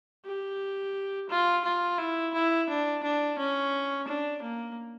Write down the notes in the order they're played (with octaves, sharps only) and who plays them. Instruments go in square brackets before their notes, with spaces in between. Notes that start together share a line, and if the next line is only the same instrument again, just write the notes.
[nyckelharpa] G4
F4
F4
E4
E4
D4
D4
C#4
D4
A#3